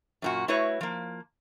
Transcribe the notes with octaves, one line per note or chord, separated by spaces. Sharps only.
F#2 A#2 F#4
A3 E4 F#4 B4 C#5
F3 A#3